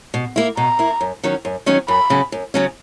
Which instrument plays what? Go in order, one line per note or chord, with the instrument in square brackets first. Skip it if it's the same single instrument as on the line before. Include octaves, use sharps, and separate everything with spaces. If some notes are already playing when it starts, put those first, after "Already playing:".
[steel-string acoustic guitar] B2
A#3 E4
[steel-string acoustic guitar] B2 [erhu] A#5
[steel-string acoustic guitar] A#3 E4
F#2
D#3 F#3 C#4
F#2
D#3 F#3 C#4
[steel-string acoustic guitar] F#2 [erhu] B5
[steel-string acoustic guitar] C#3 F#3 C#4
F#2
C#3 F#3 C#4